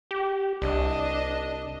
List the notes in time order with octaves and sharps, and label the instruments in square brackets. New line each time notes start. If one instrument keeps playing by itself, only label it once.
[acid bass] G4
[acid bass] C2 [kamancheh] D4 D#5